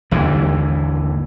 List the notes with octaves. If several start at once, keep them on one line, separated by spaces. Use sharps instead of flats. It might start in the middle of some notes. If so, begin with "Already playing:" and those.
G#1 D#2 D3 E3